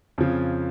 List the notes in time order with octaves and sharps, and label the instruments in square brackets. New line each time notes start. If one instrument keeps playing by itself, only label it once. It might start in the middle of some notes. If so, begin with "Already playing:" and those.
[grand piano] F2 C#3 F3